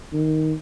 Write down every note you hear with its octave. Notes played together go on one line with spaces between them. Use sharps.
D#3